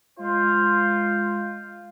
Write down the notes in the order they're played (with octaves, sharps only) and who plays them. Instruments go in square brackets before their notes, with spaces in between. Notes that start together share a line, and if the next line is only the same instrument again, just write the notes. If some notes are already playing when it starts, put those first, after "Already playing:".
[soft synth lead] G#3 [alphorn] F4 [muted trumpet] C5 [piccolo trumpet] F5